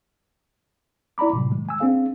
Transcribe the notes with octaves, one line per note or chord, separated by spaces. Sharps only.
E4 D5 A#5 B5 D6
A2 C3 F#3
D#3 G#3
G#5 E6
C4 D4 G#4 F5